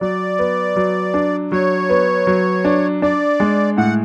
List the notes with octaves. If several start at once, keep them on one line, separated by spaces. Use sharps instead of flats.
F#3 D5
B3
F#3
D4
F#3 C#5
B3
F#3
D4
D4 D5
G#3
A2 F#5